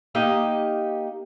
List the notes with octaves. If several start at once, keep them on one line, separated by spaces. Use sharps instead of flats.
A#3 D#4 G4 D#5